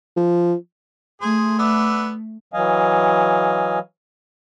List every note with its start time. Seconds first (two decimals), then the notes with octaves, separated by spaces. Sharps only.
0.17 F3
1.22 A3 G#4 C5
1.59 B3 D4 E5
2.54 E3 F#3 D#5 F5 G#5